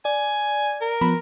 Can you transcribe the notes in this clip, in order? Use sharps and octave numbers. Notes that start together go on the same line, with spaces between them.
D5 G#5
A#4
F3 B3 B5